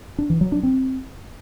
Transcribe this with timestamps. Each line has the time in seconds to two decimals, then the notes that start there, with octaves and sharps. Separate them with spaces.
0.18 D4
0.30 E3
0.41 F#3
0.52 D4
0.63 C4